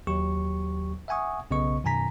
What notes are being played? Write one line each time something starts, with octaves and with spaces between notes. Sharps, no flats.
D#2 F#3 G4 C#6
E5 F#5 G#5 C#6 D#6
B1 C#3 B3 D#5 C#6
F#2 B2 D#3 G#5 A#5 B6